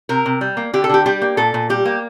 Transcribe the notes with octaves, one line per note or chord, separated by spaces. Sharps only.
C3 A#4
C3
G3
A#3
D3 G4
A4
D3 G4
G3 G4
A#3
A#2 A4
A#2
G3 G4
A#3